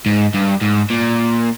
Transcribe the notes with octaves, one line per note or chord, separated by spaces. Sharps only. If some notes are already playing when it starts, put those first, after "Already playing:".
G#2
G2
G#2
A#2